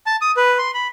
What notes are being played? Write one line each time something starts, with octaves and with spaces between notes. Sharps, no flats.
A5
D#6
B4
C6
B5